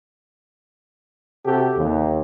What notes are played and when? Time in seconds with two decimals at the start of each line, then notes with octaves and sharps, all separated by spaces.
1.45 C3 F#4 G4 A4
1.77 D#2